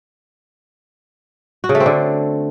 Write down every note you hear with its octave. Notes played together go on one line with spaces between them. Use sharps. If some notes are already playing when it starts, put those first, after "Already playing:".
F#4
C#3
A3
C4
D3